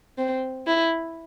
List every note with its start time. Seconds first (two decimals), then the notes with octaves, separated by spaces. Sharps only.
0.18 C4
0.67 E4